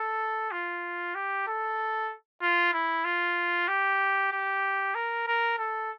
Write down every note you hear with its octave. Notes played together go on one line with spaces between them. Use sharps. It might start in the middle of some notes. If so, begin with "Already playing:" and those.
Already playing: A4
F4
G4
A4
F4
E4
F4
G4
G4
A#4
A#4
A4